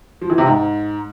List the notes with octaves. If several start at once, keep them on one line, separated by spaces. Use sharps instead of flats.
F3
E3
C3
G#2